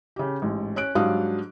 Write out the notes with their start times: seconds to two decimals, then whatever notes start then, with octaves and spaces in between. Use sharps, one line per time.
0.16 C#3 G4
0.42 A1 G#2
0.76 C#4 F#6 D7
0.95 G#2 F#3 G3 D4 F5 D#6